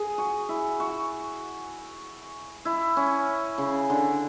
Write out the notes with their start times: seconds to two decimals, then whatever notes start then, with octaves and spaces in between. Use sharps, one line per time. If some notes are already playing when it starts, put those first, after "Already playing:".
Already playing: G#4
0.18 F#4
0.49 E4
0.80 F#4
2.65 E4
2.97 C#4
3.58 C#3
3.90 D3